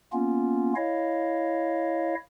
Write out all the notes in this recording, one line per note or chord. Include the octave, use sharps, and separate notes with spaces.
A#3 B3 C#4 F4
E4 C#5 D#5 F5